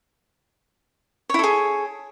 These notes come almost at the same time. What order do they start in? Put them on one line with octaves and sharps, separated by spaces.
C#5 E4 A4 G#4